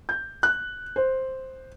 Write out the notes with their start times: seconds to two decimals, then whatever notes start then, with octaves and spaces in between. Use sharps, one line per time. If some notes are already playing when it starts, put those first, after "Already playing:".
0.09 G6
0.43 F#6
0.96 C5